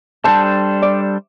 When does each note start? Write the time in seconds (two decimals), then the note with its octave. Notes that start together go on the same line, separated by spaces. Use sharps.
0.24 G3 D4 A4 C5 A5
0.82 D5